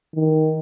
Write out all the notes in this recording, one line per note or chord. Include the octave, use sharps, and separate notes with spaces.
D#3